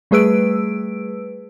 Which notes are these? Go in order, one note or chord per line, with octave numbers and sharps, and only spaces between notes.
G3 A3 G#4 B4 E6 D7